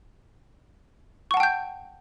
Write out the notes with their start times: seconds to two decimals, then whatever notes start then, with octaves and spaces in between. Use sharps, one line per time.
1.31 C#6
1.34 F#5
1.37 A5
1.40 G5
1.43 G6